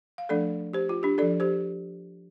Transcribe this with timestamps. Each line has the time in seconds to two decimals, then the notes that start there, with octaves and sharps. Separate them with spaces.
0.18 F5
0.29 F3 A3 D4 A4 D5
0.73 G4 C5
0.89 F4
1.03 D4 G4
1.18 F3 D4 A4 D5
1.40 G4 C5